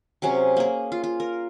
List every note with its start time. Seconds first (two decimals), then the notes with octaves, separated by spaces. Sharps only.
0.22 C3 F#3 C#4 G#4
0.57 A#3 G#4
0.92 F4
1.04 F4
1.20 A#4